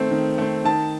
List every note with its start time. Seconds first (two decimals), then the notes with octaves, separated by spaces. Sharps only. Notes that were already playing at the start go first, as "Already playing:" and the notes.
Already playing: D#3 A3 C4
0.11 D#3
0.38 A3 C4
0.65 D#3 A5